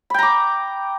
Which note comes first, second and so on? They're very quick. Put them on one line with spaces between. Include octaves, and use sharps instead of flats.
B5 G5 A#5 D6